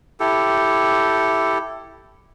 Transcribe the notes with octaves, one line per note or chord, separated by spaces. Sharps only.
E4 G4 A4